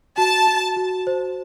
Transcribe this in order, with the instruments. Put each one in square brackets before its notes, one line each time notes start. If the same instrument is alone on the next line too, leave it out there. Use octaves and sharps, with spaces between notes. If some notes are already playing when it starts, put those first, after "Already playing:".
[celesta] F#4 [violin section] A5
[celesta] F#4
F#4
C5